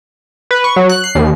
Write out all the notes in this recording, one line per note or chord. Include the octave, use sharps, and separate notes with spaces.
B4
C#6
F#3
F#6
C7
D#2